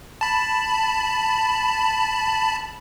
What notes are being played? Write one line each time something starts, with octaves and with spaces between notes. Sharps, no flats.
A5 B5